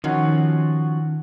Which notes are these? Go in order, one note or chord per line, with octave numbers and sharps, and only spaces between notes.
D#3 F3 C#4 F#4